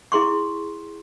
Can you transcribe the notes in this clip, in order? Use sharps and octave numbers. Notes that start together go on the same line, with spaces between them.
E4 G#4 C6 C#6